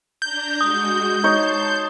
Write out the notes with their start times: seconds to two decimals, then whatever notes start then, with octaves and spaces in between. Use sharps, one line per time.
0.22 D4 A#5 G6
0.61 G#3 F#4 D#6
1.24 D#4 C#5 A5 C6